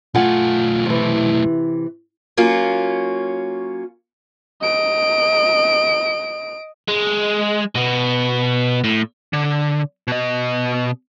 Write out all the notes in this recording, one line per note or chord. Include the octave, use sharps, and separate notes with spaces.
B1 A3 F4 F#5 G#5
C3 E3
F#3 A#3 C#4 F4
D#5 D7
G#3
B2 B3
A2
D3
B2 D#5